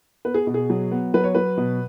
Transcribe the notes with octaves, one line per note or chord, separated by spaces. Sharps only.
B3 B4
G#4
B2
G#4
F#3
B3
F#3 B4
C#5
F#3 B4
B2